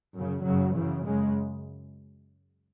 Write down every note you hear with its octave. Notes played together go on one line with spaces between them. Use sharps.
F#2 C#3
F#2 C#3 F#3
F#2 C#3 E3
F#2 C#3 G#3